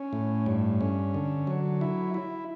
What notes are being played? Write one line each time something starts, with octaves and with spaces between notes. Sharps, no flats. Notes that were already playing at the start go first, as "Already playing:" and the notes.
Already playing: C#4
A2
G2
C#4
D3
F#3
E4
E4